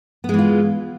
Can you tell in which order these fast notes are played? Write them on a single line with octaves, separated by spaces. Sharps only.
B3 G#3 E3 F4